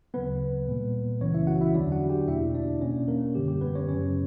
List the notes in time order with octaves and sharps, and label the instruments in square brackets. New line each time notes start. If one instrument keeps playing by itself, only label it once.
[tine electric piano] D2 C#3 F#3 B3 B4
A#2 G3 A#3
C#2 C#3 E3 G3 B3 C#4 C#5
E4 E5
F#4 F#5
E4 E5
E2 D3 F#3 B3 D4 D5
F#4 F#5
G4 G5
E2 B2 A#3 E4 E5
D4 D5
B2 A#3 C#4 C#5
A#3 A#4
F#2 D3 G3 G4
G4
B3 B4
C#4 C#5
F#2 C#3 F#3 C#4 C#5